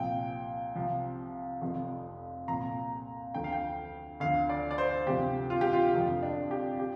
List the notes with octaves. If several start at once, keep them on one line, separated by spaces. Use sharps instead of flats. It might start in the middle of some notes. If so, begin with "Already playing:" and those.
Already playing: C2 A#2 F3 G5
C2 C3 F3
F1 F2 F3
C2 A#2 F3 A#5
D2 D3 F3 G5
F5
G5
D2 D3 F3 F5
D5
D5
C5
D2 C3 F3 G4
F4
G4
F4
F1 F2 D3 F3
D4
G4
G4